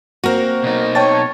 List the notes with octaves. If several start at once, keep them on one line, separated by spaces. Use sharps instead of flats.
A#3 C4 F#4 A#4
B2 D#4
C#5 G5 A5 A6